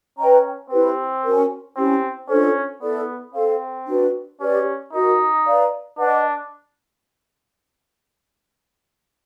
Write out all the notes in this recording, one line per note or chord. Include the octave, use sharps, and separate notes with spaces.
C#4 B4 D#5 G5 A#5
C4 E4 G4 B4
C#4 F#4 A#4
C4 C#4 E4 G4
C#4 D4 F4 A4 C5
B3 E4 A4 D5
C4 A4 C5 F5
D4 F#4 B4
C#4 G4 B4 D5
D#4 F#4 A#4 D#5
B4 D5 F5 A#5
D4 B4 D#5 F#5